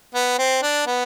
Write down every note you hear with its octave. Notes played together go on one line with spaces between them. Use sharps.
B3
C4
D4
B3